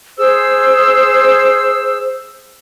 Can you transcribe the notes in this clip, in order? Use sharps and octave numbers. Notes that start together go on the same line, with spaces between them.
G#4 C5 E6